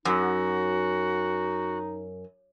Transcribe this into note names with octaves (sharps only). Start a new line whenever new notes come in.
F#2 D#4 F#4